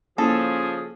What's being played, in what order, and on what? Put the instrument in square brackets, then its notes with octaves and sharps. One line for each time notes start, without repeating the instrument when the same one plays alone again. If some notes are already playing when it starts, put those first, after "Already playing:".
[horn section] C#3 F3 [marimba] A#3 C#4 E4 [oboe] G#4 [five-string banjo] A4